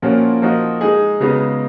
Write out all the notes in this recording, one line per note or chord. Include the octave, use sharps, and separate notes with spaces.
A#2 F3 A#3 C#4 F#4
F3 A#3 D#4 F#4
G#3 D#4 G#4
C#3 G#3 B3 D#4 F#4